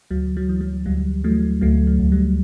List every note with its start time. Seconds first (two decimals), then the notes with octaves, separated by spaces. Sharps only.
0.11 D2 F#3
0.37 F#3
0.49 E3
0.61 F#3
0.86 D2 G3
1.24 E3 F#3 A3
1.61 D2 F#3 A3
1.87 F#3
1.99 D2
2.12 G3